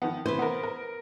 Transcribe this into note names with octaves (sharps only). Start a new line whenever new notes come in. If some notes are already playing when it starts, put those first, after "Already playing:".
D#3 F3 B3
C3 E3 B4 C5
B3 A#4
A#4